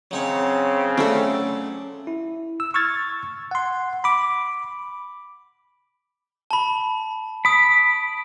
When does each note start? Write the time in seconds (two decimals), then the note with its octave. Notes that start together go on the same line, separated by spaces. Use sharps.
0.11 C#3 F#3 C4 D#4 C#5
0.98 F#3 A3 C#4 D4 A4
2.07 E4
2.60 E6
2.74 C#6 E6 F6 G#6 A6
3.51 F#5 C6
4.04 B5 D6
6.51 A5 B5
7.45 B5 D#6 D7